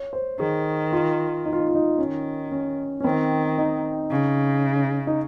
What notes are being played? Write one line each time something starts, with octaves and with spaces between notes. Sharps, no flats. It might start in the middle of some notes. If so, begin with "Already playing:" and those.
Already playing: C#5
C5
D#3 G#4
F4
D#4
F4
D#4
F4
D#4
D#3 C#4
C#4
C#4
D#3 C4
D#4
C#3
D#4